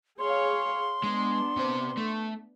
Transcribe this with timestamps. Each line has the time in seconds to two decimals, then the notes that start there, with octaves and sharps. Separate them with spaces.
0.19 G#4 C#5 F5 C6
1.04 G#3 B3 D4
1.57 C3 C5
1.97 A3